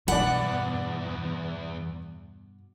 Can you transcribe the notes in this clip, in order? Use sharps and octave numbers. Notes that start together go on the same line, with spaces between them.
E2 G2 B2 B3 D5 F#5 B5